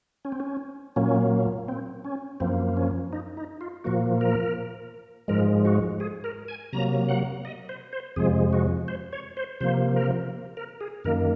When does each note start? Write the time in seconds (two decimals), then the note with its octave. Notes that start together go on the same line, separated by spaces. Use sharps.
0.25 C#4
0.32 C4
0.40 C#4
0.96 A#2 F#3 A#3 C#4
1.68 C4
2.04 C#4
2.40 F#2 F3 A#3 C4
2.77 C#4
3.13 D#4
3.37 D#4
3.61 F4
3.84 A#2 F3 A#3 F#4
4.21 A#4
5.28 G#2 F3 G#3 A#4
5.65 F#4
6.00 G#4
6.24 A#4
6.48 G#5
6.73 C3 F#3 A#3 A#5
7.09 F#5
7.45 D#5
7.69 C5
7.93 C5
8.16 F2 C3 F3 G#3 G#4
8.53 F#4
8.88 C5
9.13 C#5
9.37 C5
9.61 C3 F3 A#3 C5
9.96 A#4
10.57 A#4
10.81 G#4
11.04 F#2 D#3 A#3 A#4